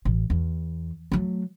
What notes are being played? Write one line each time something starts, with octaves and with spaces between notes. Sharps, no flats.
A1
E2
F#3 A3